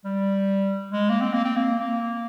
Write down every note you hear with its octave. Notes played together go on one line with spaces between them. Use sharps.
G3
G#3
A#3
C4
A#3
C4
A#3
A#3